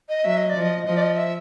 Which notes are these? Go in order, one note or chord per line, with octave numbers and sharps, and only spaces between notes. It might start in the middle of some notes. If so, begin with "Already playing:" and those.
D#5
F#3 E5
D#5
D5
F3
D#5
F3 D#5
D5
D#5
E5